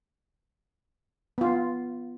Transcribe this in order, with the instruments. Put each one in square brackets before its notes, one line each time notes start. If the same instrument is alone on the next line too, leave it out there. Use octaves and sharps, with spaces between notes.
[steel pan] B3 F4